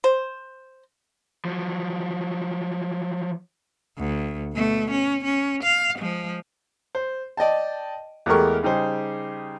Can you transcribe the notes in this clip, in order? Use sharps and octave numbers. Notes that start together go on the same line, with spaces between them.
C5
F3 F#3
D2
B2 A3
C#4
C#4
F5
F3 G#3
C5
D5 D#5 G5 A5
E2 G#3 A3 G4 A#4 C#6
C#3 G3 D#4 G4 G#4 C5